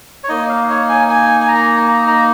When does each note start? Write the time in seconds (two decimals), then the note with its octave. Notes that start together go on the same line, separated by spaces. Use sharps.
0.24 C#5
0.28 A#3 D#4 D#5
0.49 F5
0.69 C#5
0.89 G#5
1.09 G#5
1.40 G#5
1.48 A#5
1.88 A#5
2.08 A#5